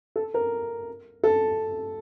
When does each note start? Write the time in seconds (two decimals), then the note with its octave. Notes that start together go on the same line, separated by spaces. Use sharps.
0.16 A4
0.34 A#4
1.24 A4